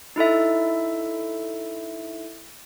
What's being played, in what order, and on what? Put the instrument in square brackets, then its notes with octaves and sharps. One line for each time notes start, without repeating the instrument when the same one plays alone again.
[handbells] D#4 E4 A4 E5